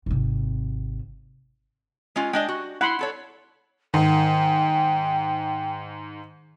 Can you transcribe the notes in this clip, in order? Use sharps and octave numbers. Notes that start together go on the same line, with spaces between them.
G#1 C3
G#3 C#4 F4
G#3 D4 D#5 G5
F#4
E4 F#5 B5 C6
E4 A4 C#5
G#2 D#3 G5